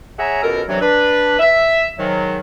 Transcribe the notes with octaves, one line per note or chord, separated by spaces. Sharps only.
G#4 C#5 E5 F#5 G#5 A#5
C#2 B2 A4 A#4
G2 C3 E3 F#3
D4 B4
E5
G#2 D#3 F#3